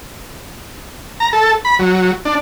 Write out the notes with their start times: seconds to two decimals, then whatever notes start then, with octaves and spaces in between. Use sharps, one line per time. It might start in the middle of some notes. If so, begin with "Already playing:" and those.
1.20 A#5
1.33 A4
1.65 B5
1.79 F#3
2.25 D4